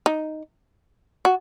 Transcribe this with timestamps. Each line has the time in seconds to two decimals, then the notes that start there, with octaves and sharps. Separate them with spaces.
0.06 D#4
1.25 F#4